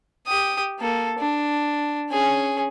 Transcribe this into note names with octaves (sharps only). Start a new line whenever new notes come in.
G4 D#6
A#3 A4
D4
C#4 G#4